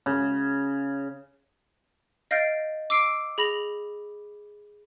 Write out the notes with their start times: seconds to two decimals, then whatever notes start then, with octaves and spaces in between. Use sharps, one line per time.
0.06 C#3
2.31 D#5 F5 F6 G6 A6 D7
2.90 D6 E6 C7 D7
3.38 G#4 B5 A#6 F7